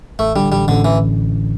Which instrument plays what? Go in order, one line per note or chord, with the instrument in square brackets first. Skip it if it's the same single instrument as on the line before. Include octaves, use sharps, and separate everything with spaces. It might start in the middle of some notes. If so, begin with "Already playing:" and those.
[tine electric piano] A1 [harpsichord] A3
[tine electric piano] D3 [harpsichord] G3
[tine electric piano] A1 [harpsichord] G3
[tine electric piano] A1 [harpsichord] D3
[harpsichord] E3